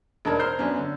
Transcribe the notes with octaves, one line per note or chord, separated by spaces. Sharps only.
E1 D4 D#4 A#4 A5 G#6
C5 A#5 F6 G6 C7
F#2 B3 C#4 D4
D3